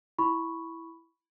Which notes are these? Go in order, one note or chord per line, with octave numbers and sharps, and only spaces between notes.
E4 B5 C#6